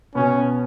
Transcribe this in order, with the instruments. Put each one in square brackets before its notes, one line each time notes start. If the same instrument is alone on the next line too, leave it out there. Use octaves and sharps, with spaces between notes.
[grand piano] B2 B3 [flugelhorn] C#4